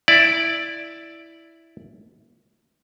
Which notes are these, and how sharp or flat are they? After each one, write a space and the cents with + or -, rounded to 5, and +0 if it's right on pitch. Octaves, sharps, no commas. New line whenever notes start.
E4 +0 D5 +0